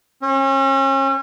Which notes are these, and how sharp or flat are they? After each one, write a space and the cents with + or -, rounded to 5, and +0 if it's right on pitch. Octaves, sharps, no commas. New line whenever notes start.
C#4 -35